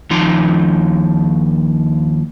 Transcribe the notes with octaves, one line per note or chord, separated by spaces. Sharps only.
D#2 F3 D#4 C6